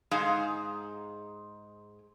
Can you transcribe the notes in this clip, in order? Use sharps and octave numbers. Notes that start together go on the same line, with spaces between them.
G#2 G#3 D#4 G#4 F5